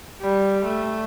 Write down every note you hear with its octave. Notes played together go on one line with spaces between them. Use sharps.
G3
A3